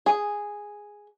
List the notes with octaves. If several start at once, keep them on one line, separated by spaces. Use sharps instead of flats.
G#4